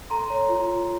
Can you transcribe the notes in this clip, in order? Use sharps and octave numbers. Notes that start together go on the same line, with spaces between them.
A4 A#5 C6
C#5
F4
F4